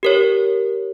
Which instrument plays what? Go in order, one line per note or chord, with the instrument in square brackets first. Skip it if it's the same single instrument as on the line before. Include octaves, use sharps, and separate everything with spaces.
[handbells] G4 A#4 C#5